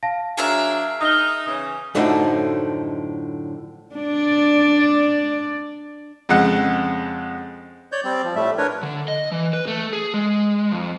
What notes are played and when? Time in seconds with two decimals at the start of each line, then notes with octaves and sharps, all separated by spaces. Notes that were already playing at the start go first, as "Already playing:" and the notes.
0.03 F5 A5 A#6
0.37 F#3 D4 G#4 A#4 E5
1.01 D#4 D#6 F6 G7
1.46 C#3 E3 C#4 D#6
1.95 F#2 A2 D3 F3 A3 D#4
3.95 D4 D5
6.29 F2 C#3 G#3 F#5
7.92 C#5 D5 G6
8.04 G3 C4 D5
8.24 F3
8.36 A2 G3 A3 E5
8.58 D4 A#4 B4 C#5
8.83 D3
9.08 D#5
9.32 E3
9.53 B4
9.67 A3
9.93 G#4
10.14 G#3
10.72 F2